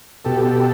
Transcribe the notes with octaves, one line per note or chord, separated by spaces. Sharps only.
B2 G4 A4